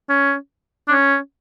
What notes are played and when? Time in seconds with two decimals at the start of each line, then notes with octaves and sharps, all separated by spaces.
0.09 C#4
0.88 D4
0.92 C#4